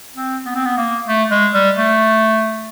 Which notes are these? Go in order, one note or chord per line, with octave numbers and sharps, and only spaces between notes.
C4
B3
C4
B3
A#3
A3
G#3
G3
A3